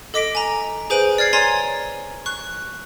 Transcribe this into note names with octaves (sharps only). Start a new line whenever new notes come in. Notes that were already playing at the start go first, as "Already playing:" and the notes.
A4 D#5 D6 A#6 B6 D7
G#5 A#5
G#4 B4 C5 G#5 D7 F#7
D5 F6 G#6 C7
C#5 D5 G#5 A#5 C6 G#6
C#6 F#6